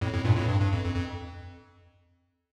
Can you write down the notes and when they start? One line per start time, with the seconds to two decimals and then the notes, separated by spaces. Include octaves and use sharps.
0.01 F2 A2
0.13 F2 A2
0.25 G2 A#2
0.36 F2 A2
0.49 G2
0.61 G2
0.73 F2
0.84 F2
0.96 F2